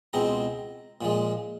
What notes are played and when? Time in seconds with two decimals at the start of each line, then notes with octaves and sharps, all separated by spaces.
0.13 C#2 B2 G#3 C4 A#5
1.01 A#2 F3 G#3